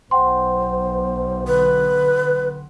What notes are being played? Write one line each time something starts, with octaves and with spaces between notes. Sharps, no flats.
B1 C5 F#5 G5 C6
D3 B4